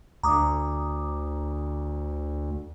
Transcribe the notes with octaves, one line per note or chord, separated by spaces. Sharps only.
D2 A#5 D6 D#6